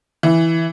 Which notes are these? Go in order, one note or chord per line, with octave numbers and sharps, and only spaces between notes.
E3